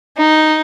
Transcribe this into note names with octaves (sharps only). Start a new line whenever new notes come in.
D#4